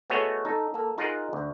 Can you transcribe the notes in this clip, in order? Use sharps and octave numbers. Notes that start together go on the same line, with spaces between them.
A3 B3 F#4 G#4 C#5 D#5
D#4 A4
A#3 A4
D#4 F4 G#4 A#4 D#5 F#5
D2